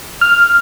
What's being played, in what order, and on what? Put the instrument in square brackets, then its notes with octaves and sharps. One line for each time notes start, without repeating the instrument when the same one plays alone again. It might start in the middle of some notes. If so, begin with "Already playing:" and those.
[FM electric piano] F6